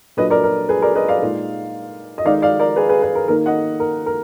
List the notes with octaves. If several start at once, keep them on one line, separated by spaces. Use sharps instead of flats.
A#2 F#3 D4 B4 D#5
A#4 D5
A#4
G#4 B4
A#4 D5
B4 D#5
D5 F5
A#2 G#3 D#4
D#5
D#3 G#3 D#4 D5 F5
D5 F5
A#4 D5
G#4 B4
G#4 B4
G#4 B4
A#4
D#3 A#3 D#4 A#4
D#5 F#5
A#4
A#4